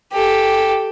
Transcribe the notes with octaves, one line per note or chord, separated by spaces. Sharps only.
G4 A4